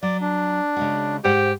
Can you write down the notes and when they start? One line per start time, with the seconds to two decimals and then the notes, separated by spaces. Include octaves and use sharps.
0.03 F#3 D5
0.21 D4
0.76 C#3 G#3 F#4
1.24 G#2 G4 C5 F#5